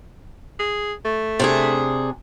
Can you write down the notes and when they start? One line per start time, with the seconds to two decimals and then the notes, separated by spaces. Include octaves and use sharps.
0.59 G#4
1.05 A3
1.39 C3 D4 G#4